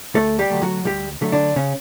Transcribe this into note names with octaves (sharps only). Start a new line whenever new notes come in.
D2 A3 A4
G3 G4
D3 F#3 A3
F#3 F#4
D2 G3 G4
D3 F#3 A3
D3 D4
C#3 C#4